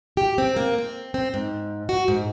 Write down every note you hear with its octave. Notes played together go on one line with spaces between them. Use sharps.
G4
C4
A#3
C4
C4
G#2
F#4
G#2